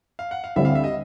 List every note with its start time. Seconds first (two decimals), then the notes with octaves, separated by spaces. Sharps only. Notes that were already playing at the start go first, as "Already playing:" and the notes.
0.19 F5
0.31 F#5
0.44 F5
0.56 D2 D3 G3 C4 E4 E5
0.65 F5
0.75 E5
0.84 D#5